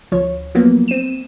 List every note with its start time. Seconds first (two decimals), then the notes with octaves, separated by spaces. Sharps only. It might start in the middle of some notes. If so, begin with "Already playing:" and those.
0.12 D2 F3 C#5
0.55 F3 F#3 A#3 B3
0.88 C4 D#7 E7